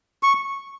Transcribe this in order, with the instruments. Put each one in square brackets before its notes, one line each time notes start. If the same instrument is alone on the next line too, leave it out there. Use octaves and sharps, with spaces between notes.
[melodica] C#6